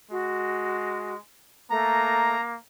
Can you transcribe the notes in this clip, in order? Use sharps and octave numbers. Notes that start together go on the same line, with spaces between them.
G#3 F#4
A3 A#3 A#5